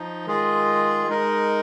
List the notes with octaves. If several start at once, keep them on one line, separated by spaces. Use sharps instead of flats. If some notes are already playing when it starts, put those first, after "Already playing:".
Already playing: F3 D#4
D#3 G#3 F4 G#4
G#3 D#4 A#4